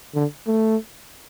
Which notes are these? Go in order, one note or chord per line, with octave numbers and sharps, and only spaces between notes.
D3
A3